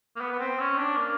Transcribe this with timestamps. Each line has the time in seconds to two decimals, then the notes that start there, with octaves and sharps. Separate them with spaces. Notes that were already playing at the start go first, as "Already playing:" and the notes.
0.16 A#3
0.21 B3
0.32 B3
0.39 C4
0.60 C#4
0.78 D4
0.97 A#3